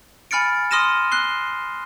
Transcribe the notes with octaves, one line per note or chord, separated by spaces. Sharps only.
G#5 B5 F6 A6 C#7 D7
C6 D#6 F6 A#6 D#7 E7
F#6 C7 G7